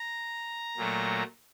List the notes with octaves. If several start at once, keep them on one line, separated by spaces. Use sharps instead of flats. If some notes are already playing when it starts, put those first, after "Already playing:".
Already playing: A#5
A#2 F#3 A3